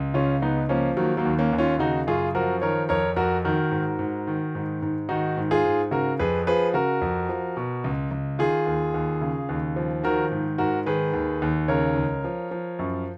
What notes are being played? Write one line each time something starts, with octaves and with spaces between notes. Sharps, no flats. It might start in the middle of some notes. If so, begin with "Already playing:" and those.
Already playing: C#2
C#3 C#4 F4
C#2 B3 D#4
F3 A#3 C#4
D#3 F#3 A#3
F#3 A#3
D#2
A#3 C#4
D#2
C#4 F4
C#3 D#4 F#4
F#2 F4 G#4
F3 F#4 A#4
D#3 A#4 C#5
F2 A#4 C#5
F2 F#4 A#4
D#3 F#4 A#4
G#2
G#2
D#3
G#2
G#2
D#3 D#4 F#4
G#2
F4 G#4
G#2
C#3 F#4 A#4
F2 G#4 B4
F3 G#4 B4
C#3 F#4 A#4
F2
F3
B2
C#2
C#2
D#3 F4 G#4
D#2
D#2
C#3
D#2
F3
D#3 F#4 A#4
G#2
G#2 F#4 A#4
D#3 G#4 B4
D#2
D#2
C#3 A#4 C#5
C#2
F3
F3
F#2